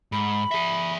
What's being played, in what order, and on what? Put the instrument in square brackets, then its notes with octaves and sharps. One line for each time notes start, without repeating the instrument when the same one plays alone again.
[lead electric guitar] G#2 [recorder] B5
[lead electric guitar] G#4 E5